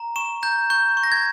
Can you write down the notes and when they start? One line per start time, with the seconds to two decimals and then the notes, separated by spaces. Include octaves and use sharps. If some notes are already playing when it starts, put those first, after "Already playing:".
Already playing: A#5
0.16 C#6 E7
0.43 A#5 G6
0.70 C#6 G6
0.97 C#6
1.03 A#6
1.12 G#6